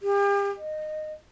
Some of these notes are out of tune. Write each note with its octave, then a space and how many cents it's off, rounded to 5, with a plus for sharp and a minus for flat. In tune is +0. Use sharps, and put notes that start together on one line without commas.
G4 +40
D#5 -15